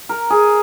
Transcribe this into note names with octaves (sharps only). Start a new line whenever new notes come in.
A#4
G#4